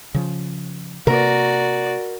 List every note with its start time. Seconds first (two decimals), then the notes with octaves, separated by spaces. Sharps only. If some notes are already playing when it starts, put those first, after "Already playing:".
0.14 C#3 F3
1.07 C3 A#3 F#4 A#4 D5